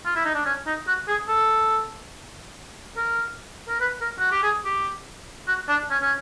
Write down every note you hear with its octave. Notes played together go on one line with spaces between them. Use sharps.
F4
E4
D#4
D4
C#4
D#4
F#4
G#4
A4
A#4
A#4
B4
A#4
F#4
G4
G#4
G4
F#4
D4
C#4
C#4